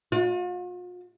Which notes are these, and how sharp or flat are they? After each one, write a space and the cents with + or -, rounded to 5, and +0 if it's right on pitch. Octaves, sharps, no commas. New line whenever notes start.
F4 +45